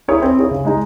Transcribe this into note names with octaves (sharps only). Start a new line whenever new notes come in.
E4 G#4 C#5
C4
E4 G#4 C#5
C#3
G#3 D#4 G#4